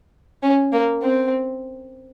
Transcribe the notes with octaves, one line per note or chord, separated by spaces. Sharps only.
C#4
A#3
C4